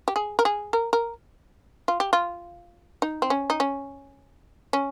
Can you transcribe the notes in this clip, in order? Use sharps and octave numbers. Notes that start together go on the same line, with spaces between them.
G4
G#4
A#4
G#4
A#4
A#4
F4
G4
F4
D#4
C4
C#4
D#4
C#4
C#4